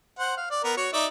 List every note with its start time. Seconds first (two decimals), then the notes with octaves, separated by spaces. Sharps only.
0.19 C5 F#5
0.37 F5
0.51 D5
0.64 B3 A#4
0.77 F#4 C#5
0.93 D#4 D5 E5